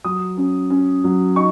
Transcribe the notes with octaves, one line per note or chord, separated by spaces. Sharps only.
F#3 D#6
C#4
C#4
F#3
D#4 C#6